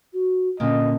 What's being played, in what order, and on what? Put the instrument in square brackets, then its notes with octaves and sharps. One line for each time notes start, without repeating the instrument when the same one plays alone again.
[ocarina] F#4
[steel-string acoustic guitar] A#2 D3 [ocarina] C#4 [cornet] D#5